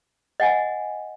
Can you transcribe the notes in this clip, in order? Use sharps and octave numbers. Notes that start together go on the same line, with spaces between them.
D#5 F#5 G#5